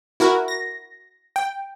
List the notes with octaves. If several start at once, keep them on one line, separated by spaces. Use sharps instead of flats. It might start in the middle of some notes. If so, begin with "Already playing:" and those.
E4 F#4 A#4
A#6
G5